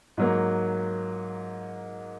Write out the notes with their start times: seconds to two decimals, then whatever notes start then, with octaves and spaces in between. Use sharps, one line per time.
0.17 G#2 F#3 A#3